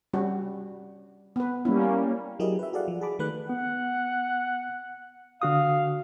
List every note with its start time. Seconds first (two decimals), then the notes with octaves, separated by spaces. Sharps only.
0.13 G3 C#4 F#4
1.36 B3 B4
1.65 G3 A#3 C#4 E4
2.40 F#3 E4 G4 G#4 A#4 D#5
2.59 B4 E5
2.73 F#4 G#4 A4 D5 F5 F#5
2.88 F3
3.01 G#4 A5 B5 D6
3.19 D#3 A3 B4 B5 F#6
3.49 B3 F#5
5.42 D3 F#4 F5 D#6